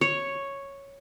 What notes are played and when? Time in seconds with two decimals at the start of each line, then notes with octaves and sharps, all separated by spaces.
0.01 C#5